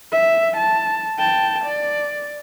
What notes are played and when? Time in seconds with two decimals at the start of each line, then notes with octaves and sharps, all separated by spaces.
0.12 E5
0.57 A5
1.18 G5 A5
1.65 D5